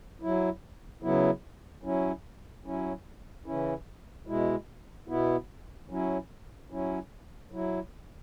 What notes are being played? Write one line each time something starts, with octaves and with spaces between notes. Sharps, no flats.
F#3 E4
C#3 F#3 B3 E4
F#3 C#4 E4
F#3 C#4 E4
C#3 E3 C#4 E4
B2 G#3 E4
B2 B3 E4
F#3 C#4 E4
F#3 C#4 E4
F#3 E4